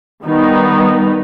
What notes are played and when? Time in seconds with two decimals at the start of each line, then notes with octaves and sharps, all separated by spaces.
0.24 D#3 G3 B3 D#4